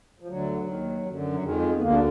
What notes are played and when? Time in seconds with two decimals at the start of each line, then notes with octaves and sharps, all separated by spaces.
0.20 F3
0.28 D2 D3 F#3
0.66 D#2 D#3
1.05 F#2 D3
1.33 F#3
1.43 F2 D#3 G#3
1.77 B3
1.81 D2 D3 A#3
1.92 D4